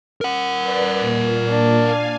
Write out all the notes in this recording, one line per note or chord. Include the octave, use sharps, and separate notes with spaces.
A#4 F#5
B4 D5
A#2
D4
F5 G#5